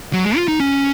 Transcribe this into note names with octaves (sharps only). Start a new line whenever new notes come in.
F#3
G#3
F4
D#4
C#4